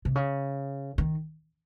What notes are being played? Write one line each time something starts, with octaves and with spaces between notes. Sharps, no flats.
C3
C#3
D#3